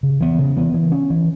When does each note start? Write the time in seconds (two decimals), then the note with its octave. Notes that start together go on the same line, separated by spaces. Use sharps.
0.03 C#3
0.21 E3 B3
0.39 C#3
0.57 E3 B3
0.74 E3
0.92 C#4
1.10 E3